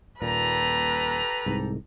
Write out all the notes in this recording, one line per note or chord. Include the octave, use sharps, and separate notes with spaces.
D#1 A#2 G4 A4 B4 A#5
C2 G#2